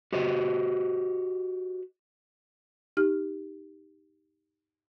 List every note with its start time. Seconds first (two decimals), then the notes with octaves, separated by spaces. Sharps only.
0.13 F#4 G4 C5 D#5
2.97 D#4 G4 F6